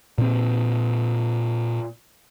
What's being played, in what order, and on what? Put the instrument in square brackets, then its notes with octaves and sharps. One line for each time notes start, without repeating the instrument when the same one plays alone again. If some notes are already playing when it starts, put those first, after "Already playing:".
[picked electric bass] A#2 C4